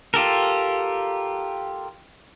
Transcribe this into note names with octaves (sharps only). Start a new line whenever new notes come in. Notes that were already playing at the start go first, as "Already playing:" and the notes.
F4 G4 A4 A#4